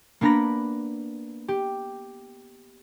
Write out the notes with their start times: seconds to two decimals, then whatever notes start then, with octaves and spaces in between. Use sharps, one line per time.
0.21 A#3 B3 D4 A#5 B5 A#6
1.48 G4